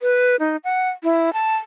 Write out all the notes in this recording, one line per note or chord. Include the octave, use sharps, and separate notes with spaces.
B4
D#4
F#5
E4
A5